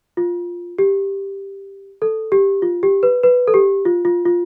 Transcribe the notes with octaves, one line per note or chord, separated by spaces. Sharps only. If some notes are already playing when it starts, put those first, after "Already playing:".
F4
G4
A4
G4
F4
G4
B4
B4
A4
G4
F4
F4
F4